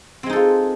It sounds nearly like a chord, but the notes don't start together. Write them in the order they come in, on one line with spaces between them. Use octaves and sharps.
C4 G#3 D#4 A4 F4